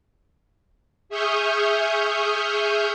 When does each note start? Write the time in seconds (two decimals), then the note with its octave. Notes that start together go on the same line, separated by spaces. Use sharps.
1.09 G#4 E5 C#6 D#6 F6 G6